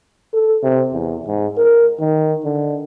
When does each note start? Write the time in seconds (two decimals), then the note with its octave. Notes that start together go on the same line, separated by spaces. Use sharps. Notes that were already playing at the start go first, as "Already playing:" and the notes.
0.33 A4
0.63 C3
0.93 E2
1.27 G#2
1.58 A#4
2.00 D#3
2.44 D3